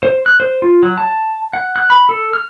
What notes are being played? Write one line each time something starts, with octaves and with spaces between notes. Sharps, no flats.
C5
F#6
C5
F4
F#3
A5
F#5
F#6
B5
A4
F6